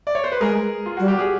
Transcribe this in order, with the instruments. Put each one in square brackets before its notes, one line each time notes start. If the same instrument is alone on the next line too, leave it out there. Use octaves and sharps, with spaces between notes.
[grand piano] D5
C#5
C5
B4
[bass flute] G#3 [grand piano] G#4 A#4
[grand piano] F4
[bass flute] G3 [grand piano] F#4
[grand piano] G4
G#4